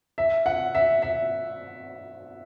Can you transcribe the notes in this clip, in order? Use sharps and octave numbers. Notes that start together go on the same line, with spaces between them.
E5
F#5
E5
E5